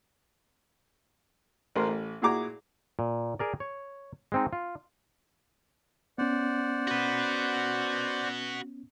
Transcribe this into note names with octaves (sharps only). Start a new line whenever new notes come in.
A1 A#4 C5
A1
A#2 E4 F#4 G#4 A#5 D6
A#2
G#4 A#4 D5
C#5
G#3 C4 D#4
F4
B3 C#4 C5 D5 F#5
F#4 B4